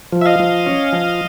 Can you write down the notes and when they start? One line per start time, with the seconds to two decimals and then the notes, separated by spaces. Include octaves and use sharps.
0.13 F3
0.21 E5
0.26 D#5 F5
0.40 F3
0.66 C#4
0.93 F3